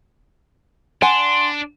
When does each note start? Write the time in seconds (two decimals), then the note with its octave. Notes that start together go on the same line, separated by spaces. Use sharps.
1.02 D4 F#5 G#5 C6